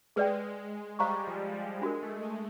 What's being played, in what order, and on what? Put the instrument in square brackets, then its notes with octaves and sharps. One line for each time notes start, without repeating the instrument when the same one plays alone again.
[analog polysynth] G#3 [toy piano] G#4 B4 D5 G5
[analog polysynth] G3 [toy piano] C5 F5 A#5 C#6
[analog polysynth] F3
G3
[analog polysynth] G#3 [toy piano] D4 F#4 A#4
[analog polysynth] A3
G#3